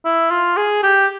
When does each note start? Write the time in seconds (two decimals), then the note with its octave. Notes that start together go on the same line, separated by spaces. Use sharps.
0.05 E4
0.31 F4
0.57 G#4
0.83 G4